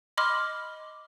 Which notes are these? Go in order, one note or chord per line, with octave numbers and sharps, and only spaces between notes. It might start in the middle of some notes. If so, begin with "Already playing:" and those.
D#5 B5 C6 D6 F6